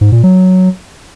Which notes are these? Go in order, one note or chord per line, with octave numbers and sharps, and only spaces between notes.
G#2
A#2
F#3